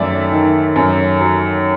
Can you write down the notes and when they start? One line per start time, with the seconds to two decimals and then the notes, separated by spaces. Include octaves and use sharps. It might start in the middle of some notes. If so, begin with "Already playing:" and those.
Already playing: F#2 D#3 A3 D5 E5
0.32 D#3
0.76 F#2
1.21 F#3